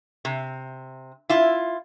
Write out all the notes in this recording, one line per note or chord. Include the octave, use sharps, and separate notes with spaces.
C3
E4 F4